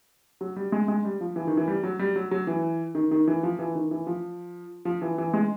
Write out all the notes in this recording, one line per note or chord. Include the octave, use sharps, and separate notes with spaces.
F#3
G3
G#3
G#3
G3
F3
E3
D#3
E3
G3
F#3
G3
F#3
F#3
E3
D#3
D#3
E3
F3
E3
D#3
E3
F3
F3
E3
E3
G#3